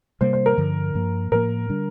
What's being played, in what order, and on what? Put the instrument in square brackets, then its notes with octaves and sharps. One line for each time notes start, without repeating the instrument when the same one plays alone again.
[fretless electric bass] C3 G3 A#3 [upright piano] C5
[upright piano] C5
A#4
[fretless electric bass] G2 D3 F3
G2 F3 A#3
[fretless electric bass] A2 F3 A#3 [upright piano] A#4
[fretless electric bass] D3 G3 D4